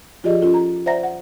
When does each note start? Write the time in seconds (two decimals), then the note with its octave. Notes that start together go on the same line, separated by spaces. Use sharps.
0.24 F3 F4 G4 G#4 D5 D#5
0.41 C#4 F4 A4
0.54 A#5
0.86 C5 D5 E5 F#5 A#5 A#6
1.03 F#5